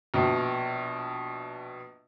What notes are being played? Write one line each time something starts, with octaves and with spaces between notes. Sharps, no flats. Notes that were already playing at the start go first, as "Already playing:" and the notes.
A#1 B2